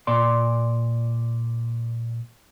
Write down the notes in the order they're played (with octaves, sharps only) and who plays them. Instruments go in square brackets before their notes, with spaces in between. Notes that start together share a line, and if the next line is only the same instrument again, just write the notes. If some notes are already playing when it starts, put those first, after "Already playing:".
[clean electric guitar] A#2 D5 C6